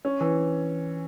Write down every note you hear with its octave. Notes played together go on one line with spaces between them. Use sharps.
C#4
E3